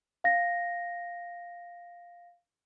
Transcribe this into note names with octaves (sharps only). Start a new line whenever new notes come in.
F5 A#6